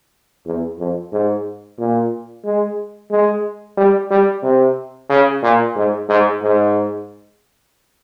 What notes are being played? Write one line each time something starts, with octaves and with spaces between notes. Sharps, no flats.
E2
F2
G#2
A#2
G#3
G#3
G3
G3
C3
C#3
A#2
G#2
G#2
G#2